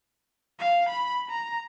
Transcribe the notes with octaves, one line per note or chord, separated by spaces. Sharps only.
F5
B5
A#5